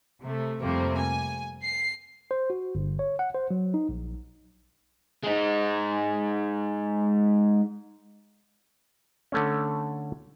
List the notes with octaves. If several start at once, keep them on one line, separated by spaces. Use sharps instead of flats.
C3 A3
F2 C3 G3 A3 A#3 C4
G#5
C7
C5
F#4
G1
C#5
F#5
C5
F#3
D#4
A#1
G#3 D#4
D3 A3 C#4